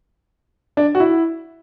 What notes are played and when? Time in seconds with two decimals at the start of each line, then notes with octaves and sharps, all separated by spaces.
0.77 D4
0.95 F#4
1.00 E4